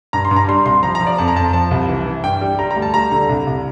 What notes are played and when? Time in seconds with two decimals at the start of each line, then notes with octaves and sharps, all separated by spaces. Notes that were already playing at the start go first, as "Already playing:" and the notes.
0.13 G2 A#5
0.25 C6
0.31 G2
0.36 A#5
0.48 G3 C6
0.66 C2 C6
0.83 F3 A#5
0.95 A#5
1.01 F3
1.07 D5
1.18 F2 A5
1.28 A#5
1.36 F2 A5
1.53 F3 A5
1.71 C2
1.89 E3
2.06 E3
2.24 G2 G5
2.41 G3
2.59 G3 A#5
2.71 A#5
2.76 D2
2.82 A5
2.94 G3 A#5
3.11 D3
3.29 C2
3.47 C2